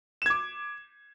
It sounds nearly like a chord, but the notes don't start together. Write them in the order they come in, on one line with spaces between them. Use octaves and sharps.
E7 G#6 D6